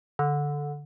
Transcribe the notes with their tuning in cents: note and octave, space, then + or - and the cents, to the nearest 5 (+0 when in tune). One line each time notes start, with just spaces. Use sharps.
D3 -10